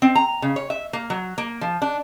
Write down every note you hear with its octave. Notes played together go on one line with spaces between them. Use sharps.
C4
A#5
C#3
C#5
E5
A#3
F#3
A#3
F3
D4